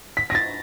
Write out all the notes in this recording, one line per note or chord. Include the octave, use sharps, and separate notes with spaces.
B6
A#6
A6